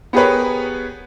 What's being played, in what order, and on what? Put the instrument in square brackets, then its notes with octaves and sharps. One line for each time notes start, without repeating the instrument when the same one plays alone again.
[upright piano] B3 G4 G#4 A#4 B4 C#5